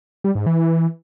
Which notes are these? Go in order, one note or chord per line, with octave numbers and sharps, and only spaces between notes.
G3
G#2
E3